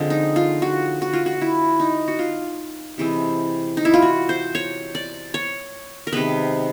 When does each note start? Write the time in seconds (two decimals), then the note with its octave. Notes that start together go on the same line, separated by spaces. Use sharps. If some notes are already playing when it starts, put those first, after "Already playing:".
Already playing: D3 F3 G#3 C4
0.10 D#4
0.36 F4
0.62 F#4
1.02 F#4
1.13 F4
1.26 F#4
1.41 E4
1.80 D#4
2.08 F#4
2.19 F4
2.98 C3 E3 G#3 C4
3.77 D#4
3.85 E4
3.94 F4
4.02 F#4
4.29 C5
4.55 C#5
4.95 D5
5.34 C#5
6.07 A#4
6.12 C3 D#3 G#3 B3 B4